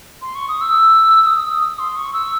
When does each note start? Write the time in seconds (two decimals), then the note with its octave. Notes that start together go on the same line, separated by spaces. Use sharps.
0.22 C6
0.35 C#6
0.48 D#6
0.61 E6
1.26 D#6
1.53 D#6
1.79 C6
1.97 C#6
2.13 E6